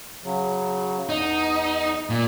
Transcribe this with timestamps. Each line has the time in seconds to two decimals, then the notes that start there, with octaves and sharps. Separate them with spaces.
0.23 C#3 F#3
1.09 E2 D#4
2.10 A#2